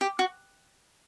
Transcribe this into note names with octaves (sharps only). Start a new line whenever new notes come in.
G4
F#4